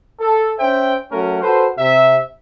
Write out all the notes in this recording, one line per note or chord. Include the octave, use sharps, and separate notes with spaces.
A4
C#4 C5 E5 G5
F#3 A3 C#4 F#4 A#4
F#4 A4 B4 C5
C3 E5